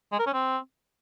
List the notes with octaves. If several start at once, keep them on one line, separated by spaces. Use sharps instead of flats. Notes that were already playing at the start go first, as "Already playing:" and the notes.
G#3
A#4
C#4
C4